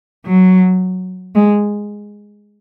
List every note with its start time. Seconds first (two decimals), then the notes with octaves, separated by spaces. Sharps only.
0.26 F#3
1.35 G#3